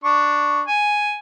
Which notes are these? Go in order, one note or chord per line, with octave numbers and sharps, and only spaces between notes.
D4 C#6
G#5